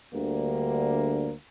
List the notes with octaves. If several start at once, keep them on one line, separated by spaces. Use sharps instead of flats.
D2 D3 G3 A#3